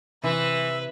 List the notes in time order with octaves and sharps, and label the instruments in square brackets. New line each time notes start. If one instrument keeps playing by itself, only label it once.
[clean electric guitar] C3 [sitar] E3 [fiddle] B4 [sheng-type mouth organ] E5